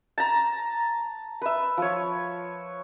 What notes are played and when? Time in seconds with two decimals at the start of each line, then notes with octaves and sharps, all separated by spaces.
0.18 A5 A#5
1.41 B4 E5
1.77 F3 C#5